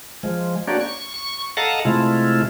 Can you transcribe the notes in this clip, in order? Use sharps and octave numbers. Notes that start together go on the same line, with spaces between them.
F3 G#3
A#3 D4 F#4 G4 C#5 D5
C#6
C#6
A4 D#5 F5 F#5 A5 A#5
C3 G#3 A3 E4 F4